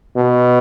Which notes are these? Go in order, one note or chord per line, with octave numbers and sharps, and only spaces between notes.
B2